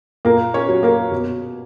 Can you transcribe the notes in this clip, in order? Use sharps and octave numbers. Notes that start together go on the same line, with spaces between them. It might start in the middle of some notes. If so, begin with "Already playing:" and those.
A#2 A#3 A#4
C#4 C#5
F#3
A#3 A#4
B2